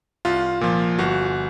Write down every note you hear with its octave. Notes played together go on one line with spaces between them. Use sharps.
C2 F4
A#2 F3
G1 F#4